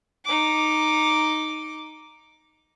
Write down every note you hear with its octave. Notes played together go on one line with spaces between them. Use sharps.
D#4 D6